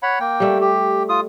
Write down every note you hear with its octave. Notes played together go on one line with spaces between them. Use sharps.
C#5 F#5 B5
A#3 G5
G3 A3
G4
F4 D#6